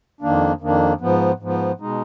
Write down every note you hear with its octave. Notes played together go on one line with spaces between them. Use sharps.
F2 D#3 A#3 D4
F2 D#3 A#3 D4
G#2 F3 B3
G#2 F3 B3
B2 G#3 D#4